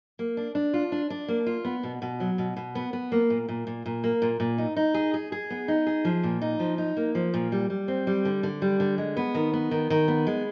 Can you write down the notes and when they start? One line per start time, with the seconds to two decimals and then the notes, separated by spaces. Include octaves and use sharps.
0.19 A#3
0.37 D4
0.55 D4
0.74 F4
0.92 D4
1.10 D4
1.28 A#3
1.46 F4
1.65 B3
1.83 B2
2.02 B2
2.20 F#3
2.38 B2
2.56 B2
2.75 B3
2.93 B3
3.12 A#3
3.30 A#2
3.49 A#2
3.67 A#2
3.86 A#2
4.04 A#3
4.22 A#2
4.40 A#2
4.58 D#4
4.76 D#4
4.94 G#4
5.14 G#4
5.32 G#4
5.50 B3
5.68 D#4
5.86 G#4
6.05 F3
6.23 A#2
6.41 D#4
6.59 F3
6.78 D#4
6.97 A#3
7.15 F3
7.34 A#2
7.52 G3
7.70 G3
7.88 C4
8.07 G3
8.25 D3
8.43 D3
8.62 G3
8.80 D3
8.98 G#3
9.17 B3
9.35 D#3
9.53 B3
9.71 D#3
9.90 D#3
10.08 B3
10.27 G#3